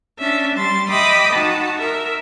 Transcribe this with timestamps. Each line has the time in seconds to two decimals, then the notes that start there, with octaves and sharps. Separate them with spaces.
0.18 C#4 D4 E5
0.54 G3 C6 A6
0.88 D#5 E5 G5 B5 D6 D#6
1.31 D#4 F#4 A5
1.77 A#4 E5